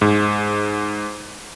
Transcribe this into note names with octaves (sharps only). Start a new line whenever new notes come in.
G#2